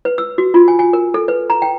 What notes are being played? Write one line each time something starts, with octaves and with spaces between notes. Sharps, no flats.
B4
E6
F#4
F4
G#5
G#5
A#4
A4
B4
A#5
G5